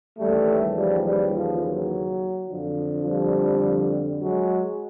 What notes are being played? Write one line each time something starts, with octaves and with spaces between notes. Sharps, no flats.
D#2 C#3 E3 G3 A3
F3 G3
F3 G3
F3
F#3
F2 D3 F3
F3 G3
F#3 G#3